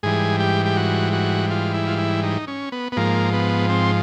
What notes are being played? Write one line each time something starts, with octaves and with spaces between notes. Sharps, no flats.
G#2 E3 G3 G#4
G4
G4
F#4
F#4
F4
E4
F4
E4
D#4
C#4
B3
B3
G#2 F3 A#3
B3
C4